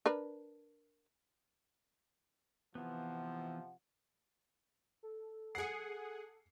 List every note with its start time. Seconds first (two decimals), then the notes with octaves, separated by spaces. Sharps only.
0.06 D4 A#4 B4
2.75 C3 E3 F3 B3 F#5
5.03 A4
5.55 G#4 F#5 C7 C#7